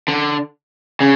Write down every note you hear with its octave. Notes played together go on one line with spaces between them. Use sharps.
D3
C#3